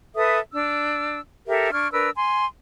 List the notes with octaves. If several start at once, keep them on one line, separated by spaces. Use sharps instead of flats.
A4 B4 E5 D#6
D4 E6
G4 A4 A#4 E5
D4 C#6 F6 G#6
D4 A#4 B4 E6
G#5 C6